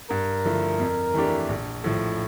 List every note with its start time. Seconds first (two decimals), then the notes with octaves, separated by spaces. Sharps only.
0.10 G2 A#4
0.45 D3 F3 A3 E4
0.80 F2
1.14 E3 A3 D4 G4
1.49 A#1
1.84 A2 F3